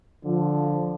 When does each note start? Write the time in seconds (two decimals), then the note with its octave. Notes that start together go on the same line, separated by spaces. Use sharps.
0.24 D3 F3